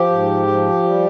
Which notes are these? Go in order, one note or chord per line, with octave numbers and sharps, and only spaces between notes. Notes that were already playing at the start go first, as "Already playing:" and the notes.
Already playing: F3 G4
G#2
F3
G3